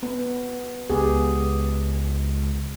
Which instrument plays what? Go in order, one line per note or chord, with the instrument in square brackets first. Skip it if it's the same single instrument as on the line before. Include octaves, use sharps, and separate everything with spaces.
[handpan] B3
[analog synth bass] C#2 [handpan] B3 G4 G#4